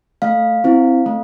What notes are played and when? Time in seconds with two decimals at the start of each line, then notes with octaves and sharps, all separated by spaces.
0.22 A3 F5
0.64 C4 E4
1.06 A3